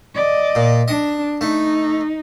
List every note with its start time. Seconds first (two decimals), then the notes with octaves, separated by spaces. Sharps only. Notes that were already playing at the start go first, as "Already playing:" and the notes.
0.15 D5 D#5
0.55 A#2
0.88 D4 D#5
1.41 A3 D#4